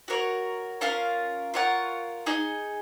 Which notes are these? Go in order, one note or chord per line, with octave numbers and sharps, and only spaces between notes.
F#4 A#4 C#5
C#4 F4 A#4 F5
F4 A#4 C#5 F#5
D#4 G#4 D#5